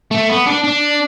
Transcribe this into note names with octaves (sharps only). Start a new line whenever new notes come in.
A3
B3
D4
D4